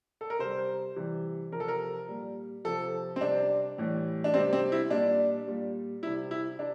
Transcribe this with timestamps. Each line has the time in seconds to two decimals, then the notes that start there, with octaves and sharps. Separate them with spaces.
0.21 A4
0.30 A#4
0.39 C3 G3 C5
0.96 C3 E3 G3
1.52 C3 F3 A#4
1.60 A4
1.68 A#4
2.08 A#2 G3
2.65 C3 F3 A4
3.16 C4
3.21 C3 G3 D4
3.78 A2 E3 G3
4.24 D4
4.34 C3 G3 C4
4.53 C4
4.72 E4
4.90 A#2 G3 D4
5.47 A#2 G3
6.02 G3 E4
6.06 C3
6.31 E4
6.59 C3 D4